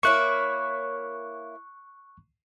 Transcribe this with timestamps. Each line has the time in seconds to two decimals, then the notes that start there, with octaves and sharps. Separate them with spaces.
0.03 A#3 E4 C#5 C#6 F#6